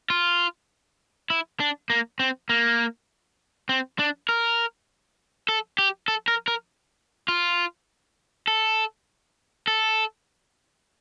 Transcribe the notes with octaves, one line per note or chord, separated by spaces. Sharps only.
F4
E4
D4
A#3
C4
A#3
C4
D4
A#4
A4
G4
A4
A#4
A#4
F4
A4
A4